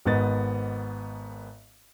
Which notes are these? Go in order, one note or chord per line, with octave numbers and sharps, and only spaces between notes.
G#1 G#2 B3 D#5 A6